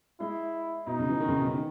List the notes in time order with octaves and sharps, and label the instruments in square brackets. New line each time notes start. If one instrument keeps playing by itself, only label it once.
[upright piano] G#3 [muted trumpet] E4
[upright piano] B2 [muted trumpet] D#4
[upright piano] C#3
E3
D#3
C#3
B2
C#3
D#3